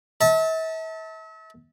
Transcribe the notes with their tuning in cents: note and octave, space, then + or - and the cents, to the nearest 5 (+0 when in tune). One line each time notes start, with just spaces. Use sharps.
E5 -40 A5 +10